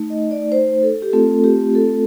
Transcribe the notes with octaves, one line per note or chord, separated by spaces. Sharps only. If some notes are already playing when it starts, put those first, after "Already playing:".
Already playing: A3 D#4
D#5
D5
C5
A4
G4
A3 C4 F4 A4
G4
A4